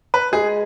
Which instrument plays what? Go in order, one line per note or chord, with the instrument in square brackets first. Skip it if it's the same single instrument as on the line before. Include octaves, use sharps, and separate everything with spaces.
[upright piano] B4
[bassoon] G#3 [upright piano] G#4